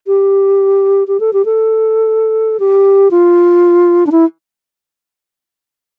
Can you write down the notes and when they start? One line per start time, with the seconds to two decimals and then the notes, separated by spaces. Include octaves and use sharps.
0.07 G4
1.08 G4
1.20 A4
1.33 G4
1.45 A4
2.60 G4
3.11 F4
4.07 D4
4.12 E4